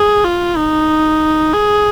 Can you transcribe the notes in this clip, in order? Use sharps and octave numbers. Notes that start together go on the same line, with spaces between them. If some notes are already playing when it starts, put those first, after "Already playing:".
Already playing: G#4
F4
D#4
G#4